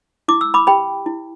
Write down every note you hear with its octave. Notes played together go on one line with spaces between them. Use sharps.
E4 D6
E6
B5 D6
G4 C5 G5 B5
E4